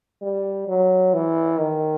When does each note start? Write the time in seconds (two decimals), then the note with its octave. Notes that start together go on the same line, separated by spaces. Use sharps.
0.22 G3
0.68 F#3
1.14 E3
1.59 D#3